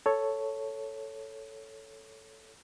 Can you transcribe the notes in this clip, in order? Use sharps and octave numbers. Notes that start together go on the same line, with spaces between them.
A4 C#5